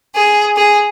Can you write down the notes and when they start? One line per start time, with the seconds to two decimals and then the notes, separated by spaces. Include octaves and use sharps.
0.14 G#4
0.56 G#4